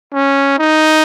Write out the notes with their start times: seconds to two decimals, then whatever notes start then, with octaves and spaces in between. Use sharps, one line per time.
0.13 C#4
0.58 D#4